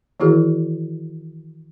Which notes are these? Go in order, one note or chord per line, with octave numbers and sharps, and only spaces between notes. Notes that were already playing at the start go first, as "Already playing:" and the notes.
D#3 E3 E4 F#4 G#4 A#4